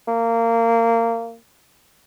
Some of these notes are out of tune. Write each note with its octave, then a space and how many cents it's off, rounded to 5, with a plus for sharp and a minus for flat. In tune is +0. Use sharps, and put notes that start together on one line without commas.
A#3 -20